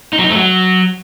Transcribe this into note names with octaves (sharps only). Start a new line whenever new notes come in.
D#4
F#3
D#4
A3
F#3